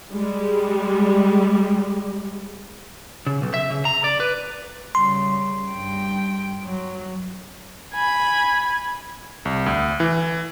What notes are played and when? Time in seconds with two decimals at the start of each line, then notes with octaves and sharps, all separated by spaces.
0.12 G3 G#3
3.27 C#3
3.42 B1
3.54 E5
3.70 C#3
3.85 A#5
4.04 D5
4.20 B4
4.95 C#3 G3 C6
5.71 G2 G5
6.63 F#3
7.93 G#5 B5
9.45 C2
9.66 D2
10.00 E3